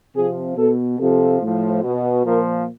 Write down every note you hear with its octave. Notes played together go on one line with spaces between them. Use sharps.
C3 F3 G#4
B2 A4
C3 F3 A4
A2 F3
B2
A#2 F3 A#4